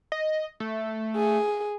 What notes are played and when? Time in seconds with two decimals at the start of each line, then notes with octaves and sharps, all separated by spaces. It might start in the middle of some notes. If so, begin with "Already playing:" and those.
0.12 D#5
0.60 A3
1.16 G#4